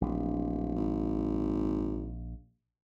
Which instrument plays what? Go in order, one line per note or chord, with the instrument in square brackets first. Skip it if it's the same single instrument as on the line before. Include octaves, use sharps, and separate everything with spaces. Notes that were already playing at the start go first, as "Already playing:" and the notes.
[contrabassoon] D1 [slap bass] A#1
[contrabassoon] G#1